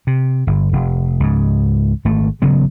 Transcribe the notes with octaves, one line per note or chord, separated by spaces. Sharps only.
C3
G1
F1
C#2 G#2
G#1 A3
A1 C#3 F#3 B3